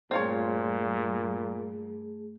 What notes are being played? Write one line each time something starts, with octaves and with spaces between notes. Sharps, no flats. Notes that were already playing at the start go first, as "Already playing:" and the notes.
G2 A#2 G3 A3 C4 F4 G#4 C#5